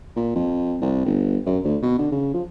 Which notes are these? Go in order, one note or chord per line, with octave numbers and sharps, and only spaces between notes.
A#2
F2
C2
G1
F#2
D2
B2
D3
C#3
F3